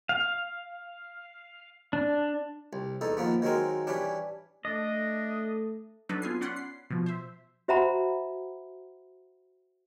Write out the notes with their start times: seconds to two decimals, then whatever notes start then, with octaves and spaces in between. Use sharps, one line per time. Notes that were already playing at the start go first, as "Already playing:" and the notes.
0.09 F5
1.93 D4
2.73 C2
3.01 E2 D#4 A4
3.17 D#3 F3 A#3 B3
3.42 D#3 F#3 G#3 C4 A#4
3.87 E3 G3 C#4 D4
4.65 A3 D4 D#5
6.09 F#3 D4 D#4 A4 B4
6.22 B3 F4 G#5 C7
6.41 C#4 D5 F#5 B5 C6
6.56 C7
6.90 B2 F3
7.06 C5 E5
7.68 F#4 C5 E5 F#5 A#5 B5